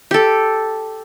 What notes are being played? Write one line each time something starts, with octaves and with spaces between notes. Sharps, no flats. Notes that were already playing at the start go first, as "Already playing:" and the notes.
G4 A4